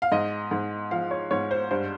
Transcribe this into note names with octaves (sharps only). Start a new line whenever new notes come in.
F5
G#2 D#5
G#2
F3 F5
C#5
G#2 C#5
C5
G2 C5